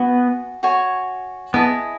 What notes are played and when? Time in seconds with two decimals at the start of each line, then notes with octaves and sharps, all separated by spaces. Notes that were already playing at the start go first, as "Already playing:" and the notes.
Already playing: B3 F#4 G#5
0.63 F#4 C#5 G#5
1.54 B3 E4 G#4 D#5 A5